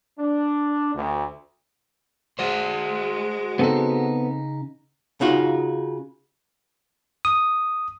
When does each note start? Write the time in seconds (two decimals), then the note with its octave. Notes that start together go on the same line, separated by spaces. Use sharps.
0.19 D4
0.95 D2
2.39 G#3 F#4 C5
3.59 C#3 B3 C4 D#4 A4
5.21 C#3 D#4 F4 F#4
7.25 D#6